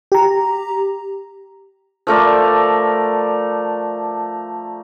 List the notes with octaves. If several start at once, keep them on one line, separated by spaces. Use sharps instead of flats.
G4 A#5
F3 A3 A#4 D5